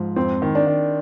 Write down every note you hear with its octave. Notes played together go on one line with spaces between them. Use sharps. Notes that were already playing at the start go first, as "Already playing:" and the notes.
Already playing: G#2 F3
F2 C4
D#3
D4
D#3